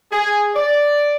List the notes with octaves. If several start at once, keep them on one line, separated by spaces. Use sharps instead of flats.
G#4
D5